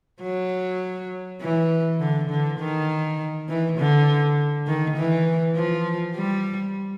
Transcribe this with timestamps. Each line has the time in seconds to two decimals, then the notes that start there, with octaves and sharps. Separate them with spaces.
0.22 F#3
1.41 E3
2.00 D3
2.30 D3
2.59 D#3
3.48 E3
3.78 D3
4.67 D#3
4.97 E3
5.55 F3
6.15 G3